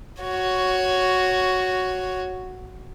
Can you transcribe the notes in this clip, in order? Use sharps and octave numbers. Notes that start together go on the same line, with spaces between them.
F#4 C#5